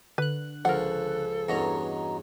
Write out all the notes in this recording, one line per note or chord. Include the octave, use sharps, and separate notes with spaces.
D3 B4 F#6
C#2 F3 A4 A#4 F#5
E2 G2 C#4 F#4 D#5 A#5